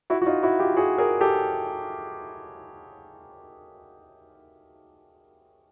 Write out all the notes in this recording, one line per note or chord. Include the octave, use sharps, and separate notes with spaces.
E4 F#4
F#4
D#4 F4
E4 F#4
F4 G4
F#4 G#4
G#4 A#4
G4 A4